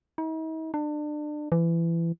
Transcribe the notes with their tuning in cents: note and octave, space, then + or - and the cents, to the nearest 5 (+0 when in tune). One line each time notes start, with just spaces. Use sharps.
D#4 +45
D4 +30
E3 +25